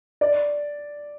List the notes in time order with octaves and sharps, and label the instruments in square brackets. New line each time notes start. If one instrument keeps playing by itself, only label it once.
[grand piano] D5